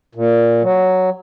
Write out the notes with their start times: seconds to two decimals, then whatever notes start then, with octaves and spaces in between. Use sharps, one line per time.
0.15 A#2
0.62 F#3